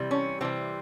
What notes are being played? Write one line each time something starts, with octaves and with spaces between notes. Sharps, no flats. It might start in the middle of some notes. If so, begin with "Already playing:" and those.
Already playing: C3 E3 G3
C#4
C3 E3 G3 C4